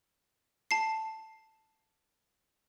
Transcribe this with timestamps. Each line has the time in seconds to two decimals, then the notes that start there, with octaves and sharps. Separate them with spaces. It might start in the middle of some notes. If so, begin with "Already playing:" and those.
0.71 A5 C7